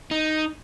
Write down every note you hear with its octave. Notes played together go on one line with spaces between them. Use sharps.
D#4